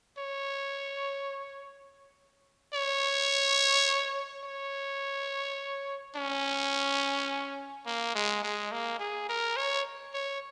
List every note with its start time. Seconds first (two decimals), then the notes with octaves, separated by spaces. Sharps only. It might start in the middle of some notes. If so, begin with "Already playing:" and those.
0.18 C#5
2.74 C#5
4.44 C#5
6.16 C#4
7.86 A#3
8.15 G#3
8.44 G#3
8.72 A#3
8.99 G#4
9.29 A#4
9.57 C#5
10.14 C#5